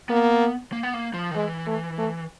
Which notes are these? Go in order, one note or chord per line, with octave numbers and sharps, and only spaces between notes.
A#3 B3
A#3
B3
A#3
F3
D#3
E3 G#3
A3
A3